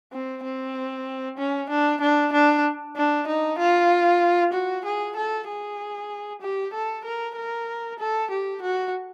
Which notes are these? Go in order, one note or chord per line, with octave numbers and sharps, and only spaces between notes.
C4
C4
C#4
D4
D4
D4
D4
D#4
F4
F#4
G#4
A4
G#4
G4
A4
A#4
A#4
A4
G4
F#4